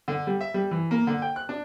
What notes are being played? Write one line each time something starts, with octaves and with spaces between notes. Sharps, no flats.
D3
G3
E5
G3
E3
A#3
D3
G5
F#6
D4